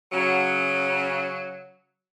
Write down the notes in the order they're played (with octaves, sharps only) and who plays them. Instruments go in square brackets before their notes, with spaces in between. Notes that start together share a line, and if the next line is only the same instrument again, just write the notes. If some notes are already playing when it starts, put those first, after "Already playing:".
[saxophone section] C#3 F#3